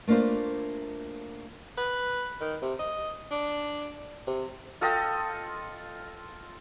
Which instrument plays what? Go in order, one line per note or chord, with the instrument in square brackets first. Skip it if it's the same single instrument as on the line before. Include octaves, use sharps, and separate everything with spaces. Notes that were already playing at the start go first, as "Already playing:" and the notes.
[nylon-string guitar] A3 A#3 D4 F4 C5
[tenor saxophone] B4
D#3
C3
D#5
D4
C3
[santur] F4 A4 D#5 G5